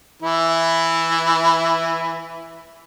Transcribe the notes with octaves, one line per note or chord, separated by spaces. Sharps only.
E3 E4